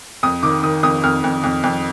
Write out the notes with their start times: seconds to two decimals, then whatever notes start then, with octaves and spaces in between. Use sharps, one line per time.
0.23 F2 D#6
0.43 D#3 D6
0.63 D#3 D#6
0.83 F2 D#6
1.04 F2 F6
1.24 F2
1.44 F2
1.64 F2